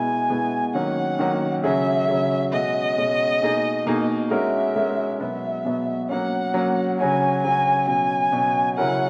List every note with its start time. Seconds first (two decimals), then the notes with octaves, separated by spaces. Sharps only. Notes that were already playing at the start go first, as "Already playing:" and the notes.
Already playing: B2 G#3 B3 E4 G#5
0.30 B2 G#3 B3 E4
0.74 D#3 F#3 A#3 C#4 F#5
1.19 D#3 F#3 A#3 C#4
1.63 C#3 F#3 C#4 G#4 E5
2.08 C#3 F#3 C#4 G#4
2.53 B2 G#3 C#4 F#4 D#5
2.98 B2 G#3 C#4 F#4
3.42 B2 A#3 D#4 G#4
3.86 B2 A#3 D#4 G#4
4.31 G#3 C#4 F#4 A#4 E5
4.76 G#3 C#4 F#4 A#4
5.20 B2 F#3 B3 E5
5.65 B2 F#3 B3
6.09 F#3 A#3 C#4 F#5
6.54 F#3 A#3 C#4
6.99 C#3 F#3 C#4 F#4 G#5
7.43 C#3 F#3 C#4 F#4 G#5
7.87 B2 F#3 C#4 G#5
8.32 B2 F#3 C#4
8.77 C#3 F#3 C#4 E4 A#4 F#5